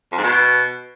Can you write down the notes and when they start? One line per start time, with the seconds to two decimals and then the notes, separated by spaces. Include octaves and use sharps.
0.12 F2
0.18 G#2
0.23 B2